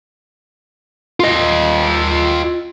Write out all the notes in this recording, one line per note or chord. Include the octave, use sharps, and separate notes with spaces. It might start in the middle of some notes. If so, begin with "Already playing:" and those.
F4 D#5